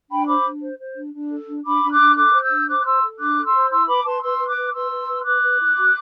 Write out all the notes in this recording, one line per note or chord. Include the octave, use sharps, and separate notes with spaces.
D4 G5 B5
C5 B5 D6
D4
C5
C5
D4
D4
A4
D4
D4 B5 D6
D4
D6 F#6
D4
A4 D6 F#6
C5
E6 G6
D4
C5 D6 F#6
F#6
C5 C6 E6
A4
D4 D6 F#6
A4
C6 E6
C5
E4 C6 E6
B4 B5 D6
B4 A5 C6
B4 C6 E6
B4
D6 F#6
B4
B4 C6 E6
B4
B4
B4 D6 F#6
B4
E4
F#4